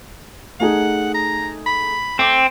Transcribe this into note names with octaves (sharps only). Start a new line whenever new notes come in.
A3 D#4 G#4 F#5
A#5
B5
A3 C4 D6